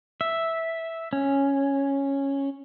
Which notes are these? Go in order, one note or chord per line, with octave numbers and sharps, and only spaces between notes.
E5
C#4